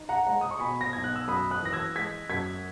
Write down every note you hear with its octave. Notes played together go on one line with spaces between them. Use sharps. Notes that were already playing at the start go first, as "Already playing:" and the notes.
Already playing: D#4
F#5 A#5
G#3 F#5 A#5
D#6
C#6
B2 G#5 B5
A#6
B1 G#6
F#6
E6
F#2 B5 D#6
D#6 F#6
E3 A#6
E6 G#6
G#3 G#6 B6
F#2 G#6 B6